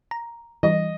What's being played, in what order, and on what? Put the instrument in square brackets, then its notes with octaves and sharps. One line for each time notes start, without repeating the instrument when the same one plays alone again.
[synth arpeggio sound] A#5
[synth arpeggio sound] E3 G3 [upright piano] D#5